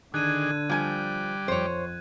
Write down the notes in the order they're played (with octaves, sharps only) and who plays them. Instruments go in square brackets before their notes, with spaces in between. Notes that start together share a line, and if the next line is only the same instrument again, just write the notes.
[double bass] D3 [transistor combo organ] D#3 D4 G#4 [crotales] F#6 G#6 D#7
[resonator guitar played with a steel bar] F3 G#5 [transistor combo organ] G3 D5
[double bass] F2 [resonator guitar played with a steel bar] C5 C#5